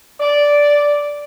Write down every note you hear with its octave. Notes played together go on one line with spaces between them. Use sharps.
D5